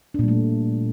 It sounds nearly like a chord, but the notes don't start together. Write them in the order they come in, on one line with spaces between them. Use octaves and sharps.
D4 A#2 G3 A3